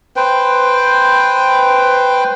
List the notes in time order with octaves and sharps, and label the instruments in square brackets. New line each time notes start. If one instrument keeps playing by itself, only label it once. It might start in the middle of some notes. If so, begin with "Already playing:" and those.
[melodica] B4 C5 G5